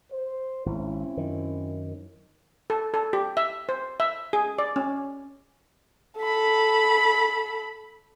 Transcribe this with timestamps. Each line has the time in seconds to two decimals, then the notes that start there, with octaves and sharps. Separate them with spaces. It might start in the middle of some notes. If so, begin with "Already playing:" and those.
0.12 C5
0.66 G#1 C4 C#4 E4
1.17 F#2 D#3
2.70 A4
2.94 A4
3.13 G4
3.37 E5
3.69 C5
4.00 E5
4.33 G#4
4.59 D5
4.76 C#4
6.18 A4 B5